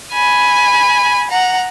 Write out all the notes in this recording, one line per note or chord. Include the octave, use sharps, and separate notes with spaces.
G#5 B5
F#5 A#5